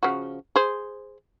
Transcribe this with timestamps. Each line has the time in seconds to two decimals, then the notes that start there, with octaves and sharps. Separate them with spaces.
0.03 C#3 F3 F#4
0.56 G#4 C5